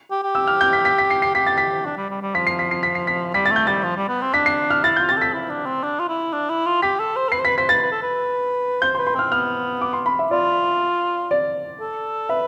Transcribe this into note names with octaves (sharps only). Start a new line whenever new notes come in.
G4
G4
E6
F6
G6
B6
B6
B6
C7
C7
G4 B6
A6
B6
D4
G3
G3
G3
F3 B6
C7
B6
C7
B6
C7
B6
G3 B6
A6
A3
G6
G3 A6
F3
G3
B3
C4
D4 B6
C7
F6
E4 A6
F4 G6
G4 A6
A4 B6
E4
D4
C4
D4
F4
E4
D4
E4
F4
G4 B6
A4
C5
A4
B4 C7
C5
B4 B6
C5 B6
B4 A6
B4
A4
B4
C5 G6
C6
B4
C6
C4 F6
B3 F6
D6
C6
B5
E5
F4 D5
D5
A4
B4 E5